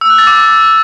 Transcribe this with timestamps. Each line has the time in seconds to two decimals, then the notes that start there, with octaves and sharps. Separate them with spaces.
0.01 E6
0.10 F#6
0.18 A6
0.27 D6